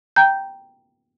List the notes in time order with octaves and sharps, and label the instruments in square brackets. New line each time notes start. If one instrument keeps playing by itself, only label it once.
[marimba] G5 A#5 G6